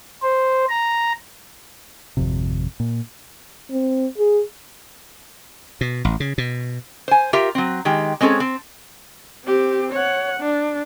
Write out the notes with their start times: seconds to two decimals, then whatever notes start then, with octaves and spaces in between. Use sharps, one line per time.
0.22 C5
0.69 A#5
2.17 G#1 F2 C3
2.80 A#2
3.71 C4
4.18 G#4
5.81 B2
6.05 A1
6.20 C#3
6.38 B2
7.08 C5 G#5
7.33 F4 G4 A#4 E5
7.55 F#3 C4
7.85 D#3 G#3 G4
8.21 G#3 C4 C#4 G#4 A4
8.40 C4
9.45 C4 G4
9.93 C#5 F#5
10.41 D4